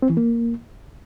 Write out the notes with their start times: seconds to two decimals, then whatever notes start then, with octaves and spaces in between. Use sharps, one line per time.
0.02 C4
0.10 E3
0.17 A#3